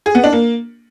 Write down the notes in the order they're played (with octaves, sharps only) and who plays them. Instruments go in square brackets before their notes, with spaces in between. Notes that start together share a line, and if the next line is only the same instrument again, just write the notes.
[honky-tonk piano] G#4
B3
D4
A#3